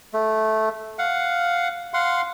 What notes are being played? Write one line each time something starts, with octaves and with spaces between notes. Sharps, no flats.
A3
F5 F#5
F5 F#5 C6